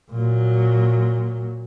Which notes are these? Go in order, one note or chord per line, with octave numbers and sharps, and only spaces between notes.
A#2 F#3